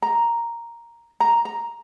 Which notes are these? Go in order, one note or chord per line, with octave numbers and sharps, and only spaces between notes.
A#5
A#5
A#5